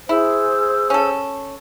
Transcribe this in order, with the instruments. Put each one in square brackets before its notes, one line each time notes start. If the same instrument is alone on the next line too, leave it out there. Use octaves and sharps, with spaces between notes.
[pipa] E4 [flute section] G#4 C5 E6
[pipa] C#4 A4